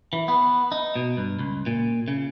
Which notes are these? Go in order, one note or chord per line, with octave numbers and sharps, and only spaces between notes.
E3
B3
D#4
B2
G2
C#2
A#2
C#3